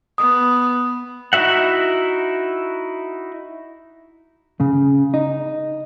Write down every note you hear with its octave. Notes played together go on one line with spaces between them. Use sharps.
B3 D#6
D#4 E4 F#4 E5 F#5
C#3
D#4